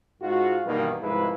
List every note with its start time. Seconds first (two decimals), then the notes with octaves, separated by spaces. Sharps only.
0.22 G#2 G#3 F4 F#4
0.65 G2 B2 D#3 E3 A#3 D#4
1.01 C2 G#2 F3 G#3 E4 B4